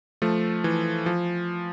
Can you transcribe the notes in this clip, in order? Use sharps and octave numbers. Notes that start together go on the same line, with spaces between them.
F3 A3
E3
F3